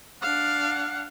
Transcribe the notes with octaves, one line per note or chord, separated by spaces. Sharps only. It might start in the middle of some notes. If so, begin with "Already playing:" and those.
D4 F5 F#5